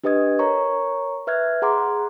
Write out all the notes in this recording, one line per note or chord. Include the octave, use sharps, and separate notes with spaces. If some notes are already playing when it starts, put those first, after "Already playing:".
D4 G4 B4 D#5 D#6 G#6
A#4 C#5 A#5 C#6
B4 E5 F6 F#6 G#6
G#4 F#5 A#5 C6 D6